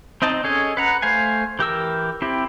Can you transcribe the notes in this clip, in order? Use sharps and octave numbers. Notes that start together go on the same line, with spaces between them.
C4 D#4 D#5 A5
C#4 G#4 A4 D#5
B4 F#5 A#5
A3 C5 F5 G#5
E3 G4 A#4 E6
C4 E4 G4